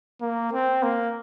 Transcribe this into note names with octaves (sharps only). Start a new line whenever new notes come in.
A#3
C4
A#3